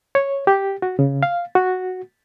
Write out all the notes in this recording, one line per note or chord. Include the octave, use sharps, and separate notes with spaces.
C#5
G4
F#4
C#3
F5
F#4